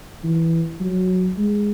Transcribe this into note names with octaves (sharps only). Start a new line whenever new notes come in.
E3
F#3
G#3